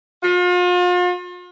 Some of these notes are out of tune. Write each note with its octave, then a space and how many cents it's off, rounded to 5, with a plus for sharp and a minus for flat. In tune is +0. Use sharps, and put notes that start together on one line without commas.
F4 +40